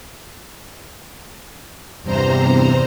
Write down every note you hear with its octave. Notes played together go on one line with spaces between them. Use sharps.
E2 G2 C3 C5 A#5